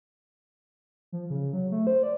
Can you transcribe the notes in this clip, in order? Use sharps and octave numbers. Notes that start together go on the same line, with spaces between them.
F3
C#3
F#3
A3
C5
D5